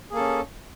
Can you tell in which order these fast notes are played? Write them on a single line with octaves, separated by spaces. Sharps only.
G#4 A#3 A4 C#4